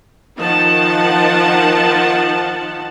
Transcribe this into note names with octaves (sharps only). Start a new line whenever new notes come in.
D#3 F3 D#4 F#5 A5